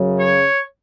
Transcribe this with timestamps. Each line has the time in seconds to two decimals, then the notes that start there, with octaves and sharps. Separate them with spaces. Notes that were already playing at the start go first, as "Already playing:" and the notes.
Already playing: F#2 C#3 F#3
0.19 C#5